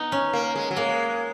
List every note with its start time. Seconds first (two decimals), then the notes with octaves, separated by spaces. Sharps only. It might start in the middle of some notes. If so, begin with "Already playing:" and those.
Already playing: B3 D#4
0.12 C#4
0.33 A#3
0.55 G#3
0.71 F#3
0.77 G#3 A#3